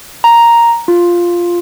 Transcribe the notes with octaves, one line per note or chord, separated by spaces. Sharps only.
A#5
F4